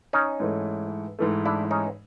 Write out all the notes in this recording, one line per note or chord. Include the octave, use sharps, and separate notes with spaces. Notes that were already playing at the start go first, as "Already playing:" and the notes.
C#4 D#4
G#2 E3 A3
G#2 E3 A3
D4 E4
C#4 D#4